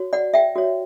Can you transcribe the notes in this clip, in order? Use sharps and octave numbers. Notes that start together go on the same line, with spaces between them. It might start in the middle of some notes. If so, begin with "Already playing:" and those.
Already playing: F#4 C#5
D5 F#5
E5 G5
F#4 C#5